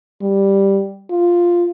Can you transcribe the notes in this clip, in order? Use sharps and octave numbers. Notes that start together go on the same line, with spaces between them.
G3
F4